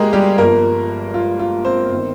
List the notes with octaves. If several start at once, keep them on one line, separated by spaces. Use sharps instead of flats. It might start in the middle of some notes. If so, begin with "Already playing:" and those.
Already playing: G1 G#3 A#3 G4 G#4 A#4
G3 G4
G1 G2 F3 A#3 A#4
F4
F4
C4 C5
G1 D#3